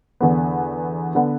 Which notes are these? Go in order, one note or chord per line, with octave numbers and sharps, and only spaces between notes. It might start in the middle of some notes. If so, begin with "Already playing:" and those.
E2 D3 B3
D3 B3